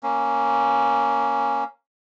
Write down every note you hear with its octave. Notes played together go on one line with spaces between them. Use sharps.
A#3 C#4